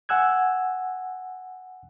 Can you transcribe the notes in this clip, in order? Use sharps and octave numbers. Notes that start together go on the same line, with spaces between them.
F#5 G#5 E6 F#6 G#6